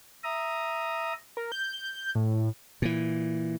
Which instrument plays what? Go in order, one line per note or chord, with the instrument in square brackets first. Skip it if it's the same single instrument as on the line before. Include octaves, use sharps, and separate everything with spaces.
[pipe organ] E5 A#5 D#6
[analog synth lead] A#4
G6
A2
[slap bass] A#2 E3